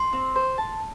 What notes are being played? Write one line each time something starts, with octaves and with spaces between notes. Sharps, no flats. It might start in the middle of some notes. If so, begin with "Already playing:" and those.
Already playing: C6
C4
C5
A5